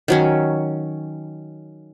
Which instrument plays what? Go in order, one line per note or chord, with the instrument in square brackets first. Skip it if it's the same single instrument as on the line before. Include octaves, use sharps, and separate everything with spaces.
[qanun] D#3 F#3 C#4